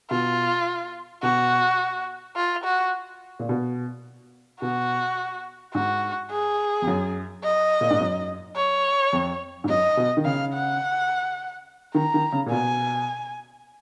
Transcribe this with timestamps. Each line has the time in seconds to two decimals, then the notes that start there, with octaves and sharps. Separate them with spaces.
0.11 B2 F4
1.23 B2 F#4
2.36 F4
2.64 F#4
3.39 A#2
3.49 B2
4.61 B2 F#4
5.75 G#2 F#4
6.31 G#4
6.82 F2
6.87 F#2
7.44 D#5
7.81 A#2
7.91 G#2
8.00 F#2
8.56 C#5
9.13 F2
9.64 G#2
9.69 F#2 D#5
9.97 B2
10.17 D#3
10.25 C#3 F5
10.54 F#5
11.95 D#3 A#5
12.14 D#3
12.33 C#3
12.46 A#2
12.51 B2 G#5